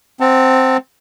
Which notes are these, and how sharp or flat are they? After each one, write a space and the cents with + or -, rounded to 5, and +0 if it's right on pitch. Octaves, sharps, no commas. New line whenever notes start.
C4 +0 F#5 +0 A5 +30